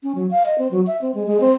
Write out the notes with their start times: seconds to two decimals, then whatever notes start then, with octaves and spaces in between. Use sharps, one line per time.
0.03 C#4
0.15 F#3
0.31 F5
0.46 D#5
0.58 C4
0.71 F#3
0.87 E5
1.02 C4
1.15 G#3
1.26 G#3
1.40 C4